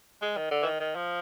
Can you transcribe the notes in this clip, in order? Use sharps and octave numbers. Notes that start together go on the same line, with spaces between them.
G#3
D#3
D3
E3
D#3
D#3
F3